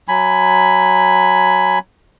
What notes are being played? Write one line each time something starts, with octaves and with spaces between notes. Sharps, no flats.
F#3 G#5 B5